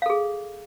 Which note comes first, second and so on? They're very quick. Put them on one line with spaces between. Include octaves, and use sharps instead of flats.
F5 A4 G#4